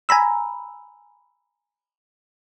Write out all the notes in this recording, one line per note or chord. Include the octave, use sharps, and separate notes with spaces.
G#5 A#5 B5 E6